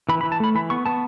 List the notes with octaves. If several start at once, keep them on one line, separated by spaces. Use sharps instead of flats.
E3 B5
B5
E3
A5
A3 B5
E3 B5
B3 C#6
B3 A5